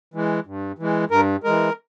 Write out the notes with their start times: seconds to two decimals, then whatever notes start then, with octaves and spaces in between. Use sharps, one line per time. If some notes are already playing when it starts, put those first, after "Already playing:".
0.14 E3 G#3
0.46 G2
0.79 E3 G#3
1.10 G2 A#4
1.44 E3 G#3 A#4